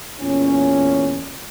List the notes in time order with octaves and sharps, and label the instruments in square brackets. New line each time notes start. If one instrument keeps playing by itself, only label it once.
[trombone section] E2 A#2 C#4